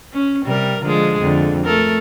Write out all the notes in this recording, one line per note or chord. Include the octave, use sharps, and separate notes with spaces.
C#4
C3 G3 A#4
D3 F3 G#3
F2 D3
A3 A4 A#4